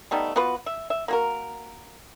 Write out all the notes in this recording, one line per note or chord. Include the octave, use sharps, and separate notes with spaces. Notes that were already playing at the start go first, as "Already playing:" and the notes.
G3 A3 B3 D#4
B3 F4 F#4 B4
E5
E5
A#3 F#4 A#4